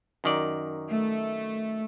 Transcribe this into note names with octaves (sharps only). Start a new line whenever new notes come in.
F#2 D#3 D5
A3